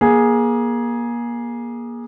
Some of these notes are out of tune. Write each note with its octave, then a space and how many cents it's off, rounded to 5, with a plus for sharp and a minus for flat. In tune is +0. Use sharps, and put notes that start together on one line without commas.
A#3 +30 G#4 +0